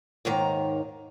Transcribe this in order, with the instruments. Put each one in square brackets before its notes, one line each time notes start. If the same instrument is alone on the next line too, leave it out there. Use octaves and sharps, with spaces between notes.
[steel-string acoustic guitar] D#2 G#2 D#3 A#5